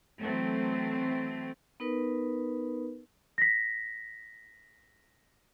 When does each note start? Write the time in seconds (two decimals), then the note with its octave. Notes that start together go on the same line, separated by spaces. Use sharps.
0.21 E3 F#3 A3 C4
1.80 B3 D#4 A#4 B4
3.38 A#6 B6